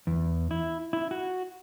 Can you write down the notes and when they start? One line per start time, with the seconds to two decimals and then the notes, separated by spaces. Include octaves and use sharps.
0.07 E2
0.51 E4
0.93 E4
1.11 F#4